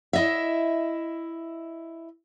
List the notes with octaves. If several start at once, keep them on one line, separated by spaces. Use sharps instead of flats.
E4 D#5 E5